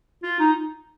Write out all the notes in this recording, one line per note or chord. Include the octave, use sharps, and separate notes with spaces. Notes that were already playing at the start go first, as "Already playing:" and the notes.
F4
D#4